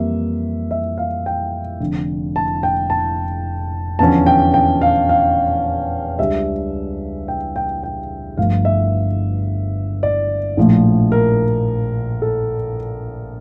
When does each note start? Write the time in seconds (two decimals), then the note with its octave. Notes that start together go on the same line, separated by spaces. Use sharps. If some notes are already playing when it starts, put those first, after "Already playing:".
Already playing: F2 E3 G3 A#3 E5
0.71 E5
0.98 F5
1.26 G5
1.80 F1 F2 D3
2.36 A5
2.63 G5
2.90 A5
3.99 E2 D3 F3 C#4 A5
4.26 G5
4.54 G5
4.82 F5
5.09 F5
6.19 C#2 C#3 G3 D4 E5
7.28 G5
7.56 G5
7.83 G5
8.37 G1 G2 F3 A3 F5
8.65 E5
10.03 D5
10.57 A#1 A2 F3 A3
11.12 A#4
12.22 A4